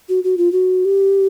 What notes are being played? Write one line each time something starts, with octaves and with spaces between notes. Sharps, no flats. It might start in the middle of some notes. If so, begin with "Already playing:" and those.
F#4
F#4
F4
F#4
G4